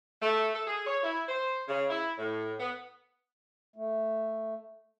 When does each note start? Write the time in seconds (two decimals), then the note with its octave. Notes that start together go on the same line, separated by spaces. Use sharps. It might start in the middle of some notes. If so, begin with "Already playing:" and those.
0.22 A3
0.53 A4
0.66 G#4
0.86 C#5
1.03 E4
1.27 C5
1.67 C#3
1.89 E4
2.18 A2
2.59 B3
3.76 A3